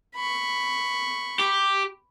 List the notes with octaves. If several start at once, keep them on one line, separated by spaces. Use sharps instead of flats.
B5 C#6
G4